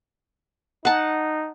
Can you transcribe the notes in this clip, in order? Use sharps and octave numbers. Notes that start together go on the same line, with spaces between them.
D#4 F#5 A5